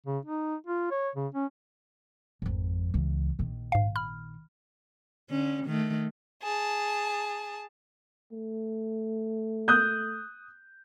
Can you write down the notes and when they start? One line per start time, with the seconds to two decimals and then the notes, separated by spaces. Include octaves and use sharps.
0.06 C#3
0.25 D#4
0.67 F4
0.91 C#5
1.16 C#3
1.35 C#4
2.42 G#1 F2
2.94 C#2 E3
3.39 A#1 D#3
3.72 G#2 F5
3.96 B5 F6
5.30 D3 C#4
5.66 D#3 A3
6.43 G#4 A5
8.32 A3
9.68 D#6 F#6 G6